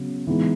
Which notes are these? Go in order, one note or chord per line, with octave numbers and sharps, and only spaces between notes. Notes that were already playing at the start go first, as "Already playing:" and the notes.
Already playing: C#3 F#3 B3
E3 G#3 B3 D#4